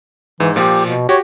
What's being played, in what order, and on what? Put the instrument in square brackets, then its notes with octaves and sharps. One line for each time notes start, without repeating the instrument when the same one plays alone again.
[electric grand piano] G#2 [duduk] E3
[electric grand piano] A#2 F3 [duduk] G4
[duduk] B2
[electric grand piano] F#4 G4 [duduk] C#5